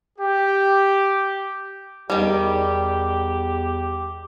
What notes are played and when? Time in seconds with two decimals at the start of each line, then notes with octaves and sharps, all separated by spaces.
0.19 G4
2.10 E2 D#3 G3 G4